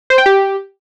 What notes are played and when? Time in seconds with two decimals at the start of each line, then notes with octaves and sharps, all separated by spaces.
0.10 C5
0.18 G5
0.26 G4